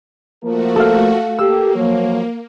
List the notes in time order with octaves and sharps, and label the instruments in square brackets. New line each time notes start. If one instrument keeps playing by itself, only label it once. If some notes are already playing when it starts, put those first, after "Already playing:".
[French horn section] F3 A#3 A#4 [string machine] A3 F#4
[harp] A4 F5
[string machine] A#3 [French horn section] G4 A4 [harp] E6
[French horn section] F3 F#3 C#5